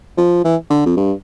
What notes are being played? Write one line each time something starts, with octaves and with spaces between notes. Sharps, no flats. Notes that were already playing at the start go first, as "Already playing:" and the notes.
F3
E3
D3
F2
G2